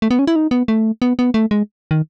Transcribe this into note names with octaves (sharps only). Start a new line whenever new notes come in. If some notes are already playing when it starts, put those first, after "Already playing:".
A3
B3
C#4
E4
D#4
B3
A3
B3
B3
A3
G#3
D#3